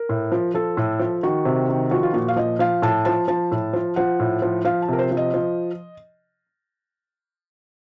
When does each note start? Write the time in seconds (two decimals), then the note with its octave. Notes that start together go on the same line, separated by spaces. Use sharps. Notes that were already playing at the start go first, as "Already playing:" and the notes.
Already playing: A#4
0.09 A2
0.32 F3
0.54 F3 A4
0.77 A2
0.99 F3
1.23 D#3 F#4
1.45 C3
1.69 D#3
1.91 F3 F#4
2.03 F4
2.13 A#2 F#4
2.28 F5
2.36 F3 D#5
2.59 F3 F5
2.82 A2 A5
3.05 F3 A5
3.28 F3 A5
3.51 A2
3.73 F3
3.96 F3 F#5
4.20 A2
4.42 F3
4.65 F3 F5
4.82 A5
4.88 C3 A#4
4.99 C5
5.11 F3
5.17 D#5
5.34 F3